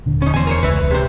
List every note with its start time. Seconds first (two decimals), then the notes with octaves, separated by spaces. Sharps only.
0.06 D#1 D3
0.22 C#4 D#4
0.34 E2 C5 G#5
0.47 A#4 C5 C#5
0.63 D1 C#2 B4 E5
0.91 C3 C5